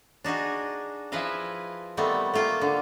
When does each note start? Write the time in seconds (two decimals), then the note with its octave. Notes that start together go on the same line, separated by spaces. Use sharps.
0.24 D4 D#4 F#4 G#4
1.12 F3 E4 G#4 B4 D#5 F5
1.97 D#3 G3 A3 B3 C4
2.34 A3 A#3 F4 G5
2.61 D3